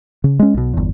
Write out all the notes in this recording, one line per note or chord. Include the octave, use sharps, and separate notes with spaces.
C#3
G#3 C#4
B1 B2
G1 E2